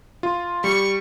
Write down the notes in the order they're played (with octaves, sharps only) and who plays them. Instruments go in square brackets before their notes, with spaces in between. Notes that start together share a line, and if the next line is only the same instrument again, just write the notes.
[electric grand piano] F4
[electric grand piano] G3 [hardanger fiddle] C#6